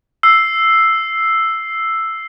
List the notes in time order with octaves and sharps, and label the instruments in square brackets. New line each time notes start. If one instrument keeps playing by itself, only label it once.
[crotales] E6 C7